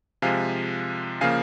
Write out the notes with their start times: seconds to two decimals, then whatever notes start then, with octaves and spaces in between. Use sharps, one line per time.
0.22 C3 F3 G#3 F5 G#5
1.21 C#3 F3 A#3 F5 G#5